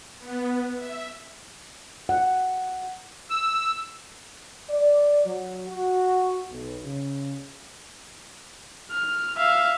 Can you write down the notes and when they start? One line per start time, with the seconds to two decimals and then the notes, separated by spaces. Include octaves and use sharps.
0.19 B3
0.75 E5
2.09 F#5
3.30 E6
4.70 D5
5.25 F#3
5.67 F#4
6.51 B1
6.84 C#3
8.91 F6
9.37 E5 F5